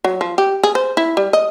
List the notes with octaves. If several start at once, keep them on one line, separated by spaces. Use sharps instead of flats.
F#3
F3
G4
G#4
C5
E4
G3
D#5